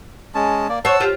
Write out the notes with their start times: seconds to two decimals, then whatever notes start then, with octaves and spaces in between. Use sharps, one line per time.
0.35 G#3 C#4 A5
0.69 A#3 D5
0.85 C5 C#5 F#5 A5 E6
1.00 F4 G4 C5